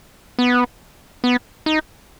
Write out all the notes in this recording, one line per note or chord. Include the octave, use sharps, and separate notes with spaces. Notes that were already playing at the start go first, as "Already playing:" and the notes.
B3
B3
D#4